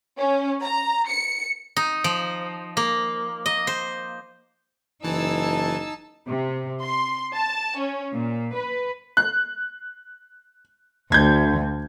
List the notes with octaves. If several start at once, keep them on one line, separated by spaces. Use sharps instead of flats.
C#4
A#5
C#7
D#4
F3
A#3
D#5
C5
F#1 E3 D#4 G#5 A5 E6
C3
C6
A5
C#4
A#2
B4
F#6
D2 G6 G#6